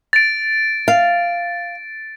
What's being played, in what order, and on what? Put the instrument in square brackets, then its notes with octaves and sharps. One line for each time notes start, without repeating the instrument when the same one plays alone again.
[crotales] A6 D7
[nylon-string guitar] F5